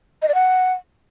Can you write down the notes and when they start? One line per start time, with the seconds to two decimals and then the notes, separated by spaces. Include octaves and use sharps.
0.22 D#5
0.28 D5
0.35 F#5